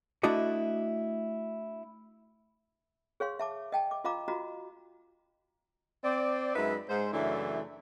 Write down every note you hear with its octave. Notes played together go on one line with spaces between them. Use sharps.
A3 D4 E4 F#4 D5 D#5
G#4 C#5 F5 C6
E5 A5 D6
D#5 G5 A5
D6
F4 D#5 F5 A#5 D6
F4 F#4 D#5 A#5
C4 D5
F#2 G#3 D#4 B4 E5
G#2 C5
F#2 C#3 E3 A3 D4 E4